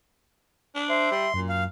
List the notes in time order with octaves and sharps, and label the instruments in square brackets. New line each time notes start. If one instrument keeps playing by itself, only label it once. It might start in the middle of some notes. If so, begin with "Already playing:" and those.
[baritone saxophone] D4
[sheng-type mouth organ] C5 [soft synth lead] E5
[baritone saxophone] G3 [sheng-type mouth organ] C6
[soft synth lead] F#2 [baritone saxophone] A#2
[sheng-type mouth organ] F5